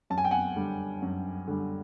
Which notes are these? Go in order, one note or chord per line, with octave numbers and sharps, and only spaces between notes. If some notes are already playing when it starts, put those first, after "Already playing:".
F#2 A5
G#5
G5
F#5 G#5
D3 G3
F#2
D3 G3